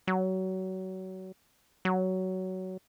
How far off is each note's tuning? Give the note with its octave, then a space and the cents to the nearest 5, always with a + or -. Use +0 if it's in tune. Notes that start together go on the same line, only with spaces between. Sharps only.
F#3 +25
F#3 +15